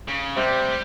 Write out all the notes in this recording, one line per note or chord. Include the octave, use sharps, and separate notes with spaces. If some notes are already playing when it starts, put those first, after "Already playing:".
C#3
C3 G3